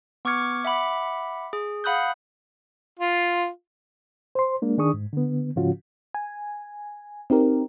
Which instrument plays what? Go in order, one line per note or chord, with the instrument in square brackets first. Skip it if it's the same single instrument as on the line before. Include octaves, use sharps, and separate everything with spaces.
[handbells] B3 C#6 D6 F6 G#6 C#7
E5 F#5 B5 D6
G#4
F5 F#5 B5 D#6 F#6 G6
[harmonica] F4
[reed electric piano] C5 C6
G#3 A#3 D4
D#3 D4 G#4 C#6 D#6
G#2
D3 B3
G#2 C#3 F3 C#4 F4 F#4
[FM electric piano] G#5
C4 D#4 G4 A#4